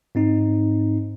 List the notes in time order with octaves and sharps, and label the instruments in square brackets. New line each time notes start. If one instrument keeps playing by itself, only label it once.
[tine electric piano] G#2 C4 D#4